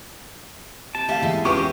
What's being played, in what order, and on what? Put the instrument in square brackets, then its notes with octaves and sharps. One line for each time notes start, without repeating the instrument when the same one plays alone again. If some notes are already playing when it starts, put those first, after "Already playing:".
[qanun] C3 [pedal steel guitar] A5
[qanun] A3 [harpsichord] G4 [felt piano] E5 F5
[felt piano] E2 [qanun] G#3 E4 C6
[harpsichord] B3 E4 [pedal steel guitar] C#4 G4 [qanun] F4 [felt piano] C#6 D6
[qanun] D#5